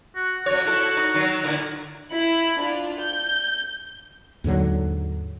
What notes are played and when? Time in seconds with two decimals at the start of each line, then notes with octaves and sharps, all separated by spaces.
0.15 F#4
0.46 F2 F#4 C#5
0.65 E4 A4
0.97 D#4
1.14 D#3 F#3
1.44 A#2 D3 E4
2.12 E4 B5
2.58 D4 F4
3.00 G6
4.44 D#2 G#2 D3 F#3